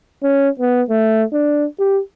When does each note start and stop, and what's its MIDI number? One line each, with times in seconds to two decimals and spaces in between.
0.23 0.49 61
0.59 0.82 59
0.90 1.23 57
1.33 1.65 62
1.79 2.00 67